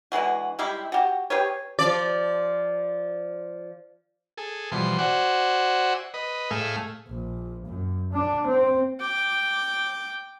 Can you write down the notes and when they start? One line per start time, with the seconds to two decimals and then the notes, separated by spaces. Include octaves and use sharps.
0.12 D3 E3 G#3 F#4
0.59 G3 G#3 E4 G4
0.92 F#4 G4
1.30 G4 G#4 B4 C#5
1.79 F3 D5
4.37 G#4 A4
4.72 B2 E3 F3 G3 C6
4.98 F#4 C5 D5 E5 F#5 G#5
6.14 B4 D#5
6.51 A2 A3 G#4 F5 E6
7.07 A#1
7.65 F#2
8.12 D4
8.46 C4
9.00 G5 D6